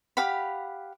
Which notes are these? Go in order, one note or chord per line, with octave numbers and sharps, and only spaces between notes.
G4 F5 F#5 B5